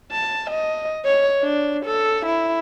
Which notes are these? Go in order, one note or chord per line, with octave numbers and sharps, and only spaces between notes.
A5
D#5
C#5
D4
A4
E4